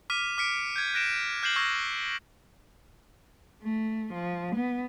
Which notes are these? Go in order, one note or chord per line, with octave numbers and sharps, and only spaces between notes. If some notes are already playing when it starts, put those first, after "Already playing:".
D6 F6 B6 D#7
D6 F6 B6 C#7 D7
G6 G#6
F#6 A#6 D7 E7
F6 G6 G#6 C7 E7 F#7
C#6 E6 G#6 A#6
A3
F3
B3